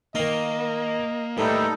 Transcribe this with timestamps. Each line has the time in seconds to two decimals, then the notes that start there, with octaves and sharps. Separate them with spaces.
0.15 D#3 A#3 D#4 D#5
1.38 A2 G3 A#3 D#4 G4 A4 B4